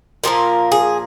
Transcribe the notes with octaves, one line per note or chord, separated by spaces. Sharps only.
A#2 F3 A#3 A#4
G#4